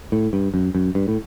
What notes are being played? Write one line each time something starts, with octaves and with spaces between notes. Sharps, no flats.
A2
G2
F#2
F#2
G2
A2